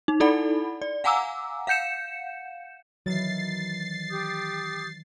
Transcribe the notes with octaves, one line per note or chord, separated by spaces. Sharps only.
D#4
D#4 E4 A4 D5 F#5 B5
D5
F5 F#5 G#5 A#5 D6 E6
F5 F#5 G6 C#7 E7
D#3 E3 F#3 A6 C7
G4 D#6 G6